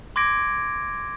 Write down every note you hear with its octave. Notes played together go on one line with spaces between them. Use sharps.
C6 D6 G#6 A#6 D7